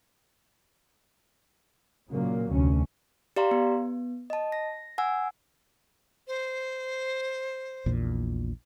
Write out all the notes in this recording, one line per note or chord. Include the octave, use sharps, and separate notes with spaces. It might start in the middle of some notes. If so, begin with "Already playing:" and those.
A#2 C#3 F#3 A#3
F1 D2 C#4
G4 D5 F5 A#5 C6
B3
D#5 A5
A#6
F#5 G#5 E6
C5
A#1 E2 A#2